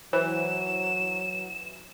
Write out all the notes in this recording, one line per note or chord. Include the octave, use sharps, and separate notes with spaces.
E3 F#3 C5 E7